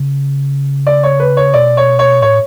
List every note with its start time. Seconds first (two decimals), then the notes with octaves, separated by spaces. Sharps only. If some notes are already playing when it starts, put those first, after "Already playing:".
Already playing: C#3
0.87 D5
1.03 C#5
1.20 B4
1.37 C#5
1.54 B2 D5
1.77 C#5
1.99 C#5
2.22 A2 C#5